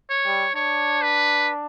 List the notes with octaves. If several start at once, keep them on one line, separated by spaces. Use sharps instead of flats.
C#5
G3
D4 C#5
B4